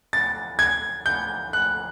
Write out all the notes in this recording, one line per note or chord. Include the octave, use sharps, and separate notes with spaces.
A6
G#6
G6
F#6